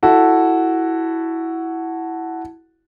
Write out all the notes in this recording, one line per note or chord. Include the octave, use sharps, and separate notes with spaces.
E4 F#4 A4